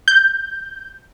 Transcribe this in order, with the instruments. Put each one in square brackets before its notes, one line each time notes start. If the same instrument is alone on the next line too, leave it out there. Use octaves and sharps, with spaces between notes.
[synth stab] G6